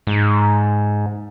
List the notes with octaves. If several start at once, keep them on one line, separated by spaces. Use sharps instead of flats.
G#2